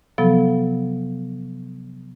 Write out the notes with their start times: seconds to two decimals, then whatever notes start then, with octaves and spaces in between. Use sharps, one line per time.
0.18 C3 F3 F#3 B3 A4